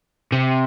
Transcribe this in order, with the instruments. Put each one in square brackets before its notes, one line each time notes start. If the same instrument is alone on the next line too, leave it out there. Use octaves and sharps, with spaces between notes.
[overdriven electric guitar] C3